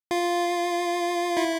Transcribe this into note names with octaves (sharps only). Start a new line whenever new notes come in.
F4
E4